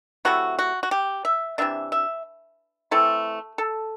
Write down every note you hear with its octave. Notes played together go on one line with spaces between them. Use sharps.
C3 F#3 A3 E4 F#4
F#4
F#4
G4
E5
C3 E3 B3 D4 E5
E5
E3 A3 C4 E4 A4
A4